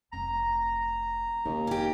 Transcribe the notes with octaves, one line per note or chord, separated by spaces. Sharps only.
F1 C4 A#5
D#2 C#3
F1 C#4 G4